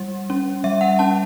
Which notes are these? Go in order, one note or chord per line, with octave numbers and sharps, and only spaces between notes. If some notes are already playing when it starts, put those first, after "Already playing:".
Already playing: G3
C#4
G3 E5
F#5
C#4 A5